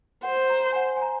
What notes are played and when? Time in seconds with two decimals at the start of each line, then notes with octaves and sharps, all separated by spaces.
0.23 C5 F#5
0.50 A#5
0.72 G#5
0.76 F#5
0.97 G#5
1.02 A#5